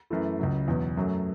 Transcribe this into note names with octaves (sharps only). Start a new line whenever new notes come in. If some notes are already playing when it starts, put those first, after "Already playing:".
F#2 E3 A3 E4
C#2 C#3 F#3
E2 B2 F#3
F#2 F#3 A3